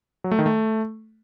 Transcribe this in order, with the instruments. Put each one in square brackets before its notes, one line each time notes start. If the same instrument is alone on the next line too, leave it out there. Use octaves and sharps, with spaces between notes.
[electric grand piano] F#3
A3
D#3
A3